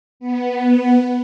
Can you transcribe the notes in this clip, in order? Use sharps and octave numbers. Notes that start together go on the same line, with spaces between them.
B3